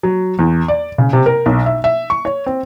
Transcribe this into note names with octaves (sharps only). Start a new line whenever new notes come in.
F#3
E2
D5
C#3
C3
A#4
B1
E5
E5
C#6
C#5
C4